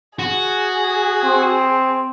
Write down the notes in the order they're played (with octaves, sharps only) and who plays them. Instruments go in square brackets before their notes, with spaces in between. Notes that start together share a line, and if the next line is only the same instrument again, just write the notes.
[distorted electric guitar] F#4 [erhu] G#4
[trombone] C4